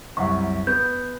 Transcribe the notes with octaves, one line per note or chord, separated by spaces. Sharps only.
C2 F#2 F#5 C#6
B3 G6